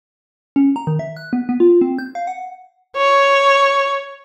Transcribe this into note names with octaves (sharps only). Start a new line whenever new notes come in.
C#4
A#5
D#3
E5
F#6
B3
B3
F4
C4
G6
F5
F#5
C#5